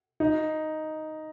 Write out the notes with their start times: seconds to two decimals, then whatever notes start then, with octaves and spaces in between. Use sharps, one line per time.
0.20 D#4